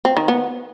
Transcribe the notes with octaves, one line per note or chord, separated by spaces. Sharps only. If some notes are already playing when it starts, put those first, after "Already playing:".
C4
D#3
B3